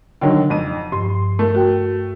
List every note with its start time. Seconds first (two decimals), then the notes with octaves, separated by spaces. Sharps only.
0.21 D3 D#3 F#3 G5
0.50 F2 D#7
0.92 G2 F3 C6
1.39 A3 A#4
1.55 F#4 G5